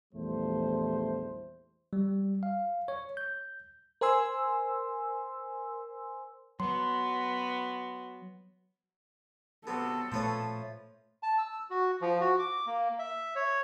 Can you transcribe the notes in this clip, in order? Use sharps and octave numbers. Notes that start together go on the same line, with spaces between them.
A#1 E2 G3 A3 C5
G3
F5
C#5
G6
A#4 C5 G#5 C6 E6
F#3 B3 F#4 C6
C3 F#3 B3 A4
A#2 F3 A3 B4 C#5 D#6
A5
E6
F#4
F3
F#4
D6
A#3
E5
C#5